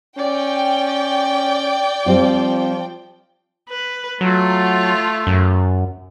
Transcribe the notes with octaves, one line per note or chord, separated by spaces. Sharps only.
C#4 D5 G5
F3 G3 C4 F4
B4
F#3 A3 F4
F#2